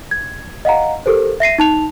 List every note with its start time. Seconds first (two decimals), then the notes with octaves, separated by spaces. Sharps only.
0.11 G#6
0.65 D#5 F5 F#5 A#5
1.06 G4 A4 A#4 C5
1.40 E5 A#6 C7 D#7
1.58 D#4 A5 F7